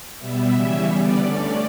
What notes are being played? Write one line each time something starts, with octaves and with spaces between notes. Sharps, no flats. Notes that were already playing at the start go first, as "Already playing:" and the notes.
B2 G3 B3 E5
C#3 E3 G3 C#4
D3 G3 B3 D5
D3 A3 C#4